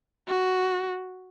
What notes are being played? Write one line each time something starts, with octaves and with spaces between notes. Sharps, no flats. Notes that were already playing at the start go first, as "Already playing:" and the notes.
F#4